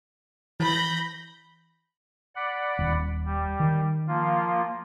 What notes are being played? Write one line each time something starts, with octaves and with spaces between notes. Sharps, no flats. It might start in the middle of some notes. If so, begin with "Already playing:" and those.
E3 B5 G6 A#6
D5 F#5 B5
D#1
G3
D#3
F3 A#3 F4